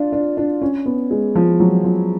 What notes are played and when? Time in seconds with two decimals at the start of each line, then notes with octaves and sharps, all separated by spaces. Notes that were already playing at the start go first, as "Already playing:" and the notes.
Already playing: D4 F4
0.13 D4
0.37 D4
0.62 C#4
0.86 B3
1.11 G#3
1.35 F3
1.60 F#3
1.84 F3